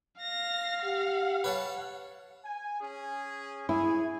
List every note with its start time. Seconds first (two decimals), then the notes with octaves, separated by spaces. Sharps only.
0.21 F5 A#6
0.84 G4 F#5
1.44 B4 C#5 A5
2.44 G#5
2.81 C#4 G#4
3.69 E4 G#4 C#5 G#5